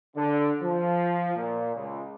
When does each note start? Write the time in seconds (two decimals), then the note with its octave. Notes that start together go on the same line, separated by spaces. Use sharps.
0.15 D3
0.62 F3
1.36 A#2
1.75 C#2